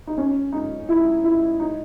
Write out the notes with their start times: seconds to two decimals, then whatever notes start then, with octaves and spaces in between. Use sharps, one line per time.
0.07 D#4
0.18 C#4
0.52 D#4
0.89 E4
1.24 E4
1.60 D#4